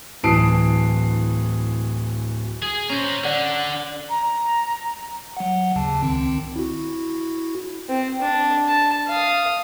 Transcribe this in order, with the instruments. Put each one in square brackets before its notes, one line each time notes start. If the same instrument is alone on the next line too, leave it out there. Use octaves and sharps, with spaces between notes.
[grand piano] D1 E3 A5 D#6 C7 D7
[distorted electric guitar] G#4
[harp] C#4 [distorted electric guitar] C5 A#5
[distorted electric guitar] D3 [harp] D5 F#5
[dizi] A#5
[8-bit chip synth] F#3 F#5
D#2 C#3 A5
C#2 D#3 C4
E4 F#4
[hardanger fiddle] C4
D4
A5
F5 D#6